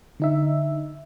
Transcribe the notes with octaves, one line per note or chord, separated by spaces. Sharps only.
D3 D#4 E5